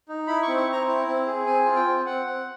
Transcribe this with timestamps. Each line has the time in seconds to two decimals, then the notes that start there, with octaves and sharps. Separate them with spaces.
0.09 D#4
0.27 E4 B5
0.43 C#6
0.48 C4
0.58 C#6
0.67 C4
0.73 A#5
0.87 E4
1.07 C4
1.27 G#4
1.46 C4 G#5
1.66 F4
1.76 G5
1.86 C4
2.06 C4 F#5
2.26 C4